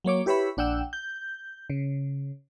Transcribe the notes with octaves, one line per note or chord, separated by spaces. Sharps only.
F#3 A#3 C#5 D6
E4 G4 B4 C#5 E5 B5
A#1 D4 F#5 G5 E6
G6
C#3